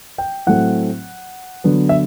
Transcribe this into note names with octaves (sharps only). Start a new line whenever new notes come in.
G5
A2 F#3 A3 C4 F#5
D3 F#3 B3
E5